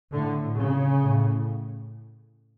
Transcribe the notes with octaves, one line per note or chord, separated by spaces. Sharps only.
A2 D3
C#3
A2